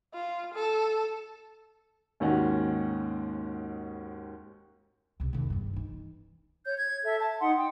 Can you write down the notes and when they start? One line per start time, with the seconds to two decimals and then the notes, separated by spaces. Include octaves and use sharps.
0.14 F4
0.55 A4
2.20 D#2 G#2 D#3 C#4 F#4 F#5
5.20 C#2 C3
5.33 E2 D#3
5.50 G2 E3
5.73 E3 D#4
6.65 C#5 G6
6.79 G#6
7.04 A4 E5
7.20 A5
7.40 D#4 F#5 C6
7.56 G5